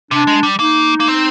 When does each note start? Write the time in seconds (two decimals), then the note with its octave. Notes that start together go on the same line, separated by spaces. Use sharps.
0.11 C3 D4
0.27 G#3
0.43 G3
0.59 A#3 D#4
1.00 A#3
1.08 C4